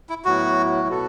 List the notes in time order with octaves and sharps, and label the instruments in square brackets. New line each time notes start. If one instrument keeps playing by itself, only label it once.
[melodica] E4
[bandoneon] A2 F#3 B3 E4 [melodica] F#4
[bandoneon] B2 B3 F#4 A4